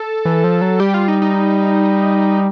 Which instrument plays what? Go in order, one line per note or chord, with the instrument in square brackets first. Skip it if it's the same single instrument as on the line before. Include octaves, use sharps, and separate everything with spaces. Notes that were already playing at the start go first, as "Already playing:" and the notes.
Already playing: [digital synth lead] A4
[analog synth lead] E3
F3
F#3
[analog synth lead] G3 [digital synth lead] G4
[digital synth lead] F4
D#4
D#4